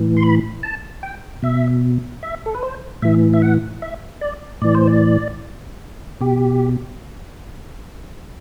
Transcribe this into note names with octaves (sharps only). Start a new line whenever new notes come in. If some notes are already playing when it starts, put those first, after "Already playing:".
Already playing: A2 E3
C6
B5
A5
G5
B2 E5
E5
A4
B4
C5
A2 E3 E5
E5
F#5
E5
D5
A2 E3 D5
C5
D5
B2 G4